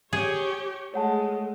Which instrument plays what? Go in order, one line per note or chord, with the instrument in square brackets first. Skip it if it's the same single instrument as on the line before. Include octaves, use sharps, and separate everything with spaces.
[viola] G4 C#5 [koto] G#4
[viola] G#3 A3 [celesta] C#5 F#5 A5